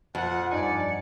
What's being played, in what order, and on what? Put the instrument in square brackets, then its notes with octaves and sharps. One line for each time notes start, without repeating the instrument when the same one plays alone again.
[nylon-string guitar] F2 [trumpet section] F#5
[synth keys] G2 D#4 G#5 [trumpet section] D5 [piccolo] C#7